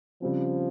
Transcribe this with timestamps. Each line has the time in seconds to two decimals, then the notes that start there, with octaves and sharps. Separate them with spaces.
0.22 C#3 F3 G3 C4